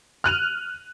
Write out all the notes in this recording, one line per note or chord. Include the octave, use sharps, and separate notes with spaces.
F6 F#6 D#7 F7